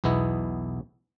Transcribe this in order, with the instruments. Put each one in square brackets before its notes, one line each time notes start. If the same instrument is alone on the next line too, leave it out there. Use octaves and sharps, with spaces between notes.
[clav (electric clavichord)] B1 E2 B3 E4 D#5